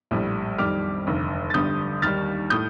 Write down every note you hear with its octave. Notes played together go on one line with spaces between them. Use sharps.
A#1 A2 G3
F2 D#3 G3 D6 F6
F1 D#2 D3
A6
G1 G2 D3 G3 D#6 G6
D#2 D#3 G3 F6 A6
A2 D#6 G6